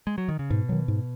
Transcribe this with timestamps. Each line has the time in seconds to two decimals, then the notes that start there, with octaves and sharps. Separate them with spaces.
0.07 G#3
0.18 F#3
0.29 D#3
0.39 C#3
0.50 G#2 B2
0.69 D#3 F#3
0.88 G#2